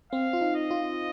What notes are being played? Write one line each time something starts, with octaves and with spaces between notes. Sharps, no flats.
C4 F5
F4
D#4
D#5
F4